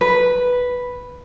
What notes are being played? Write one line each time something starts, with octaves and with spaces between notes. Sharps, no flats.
B4